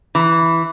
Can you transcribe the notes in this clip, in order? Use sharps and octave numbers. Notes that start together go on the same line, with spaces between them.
E3